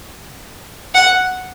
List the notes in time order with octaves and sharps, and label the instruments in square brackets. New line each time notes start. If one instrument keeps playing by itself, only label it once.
[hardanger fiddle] F#5